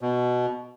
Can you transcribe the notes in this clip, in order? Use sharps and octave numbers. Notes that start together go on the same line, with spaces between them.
B2